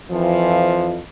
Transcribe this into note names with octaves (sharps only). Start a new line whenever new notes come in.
F2 E3 F3